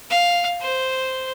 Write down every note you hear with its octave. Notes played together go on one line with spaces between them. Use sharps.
F5
C5